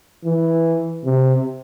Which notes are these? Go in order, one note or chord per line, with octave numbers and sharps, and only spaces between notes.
E3
C3